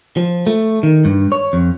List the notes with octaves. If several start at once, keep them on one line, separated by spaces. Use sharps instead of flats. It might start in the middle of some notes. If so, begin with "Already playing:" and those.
F3
A3
D#3
G2
C#5
F2